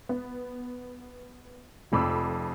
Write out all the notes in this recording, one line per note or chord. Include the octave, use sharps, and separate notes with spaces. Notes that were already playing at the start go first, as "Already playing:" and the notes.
B3
F1 F2 B5 D6 E6